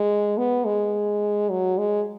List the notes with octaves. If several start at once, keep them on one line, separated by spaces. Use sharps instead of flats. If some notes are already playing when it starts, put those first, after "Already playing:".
Already playing: G#3
B3
G#3
F#3
G#3